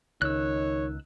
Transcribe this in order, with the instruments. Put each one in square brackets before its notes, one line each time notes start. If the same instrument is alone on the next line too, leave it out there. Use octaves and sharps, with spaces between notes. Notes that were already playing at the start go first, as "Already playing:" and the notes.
[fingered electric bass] C#2 [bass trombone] D#3 [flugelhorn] C#5 [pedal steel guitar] E6 F#6